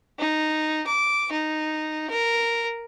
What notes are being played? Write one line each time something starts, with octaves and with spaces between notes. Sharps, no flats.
D#4
D6
D#4
A#4